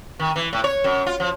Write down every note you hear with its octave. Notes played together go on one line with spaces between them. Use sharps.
D#3
E3
A2
C#5
F#2
F4
F3